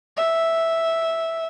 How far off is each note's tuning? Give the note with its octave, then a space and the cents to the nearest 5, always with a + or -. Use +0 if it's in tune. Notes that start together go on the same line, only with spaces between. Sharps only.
E5 -5